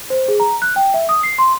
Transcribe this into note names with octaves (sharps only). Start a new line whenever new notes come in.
C5
G#4
A#5
F#6
G5
E5
D#6
C7
C6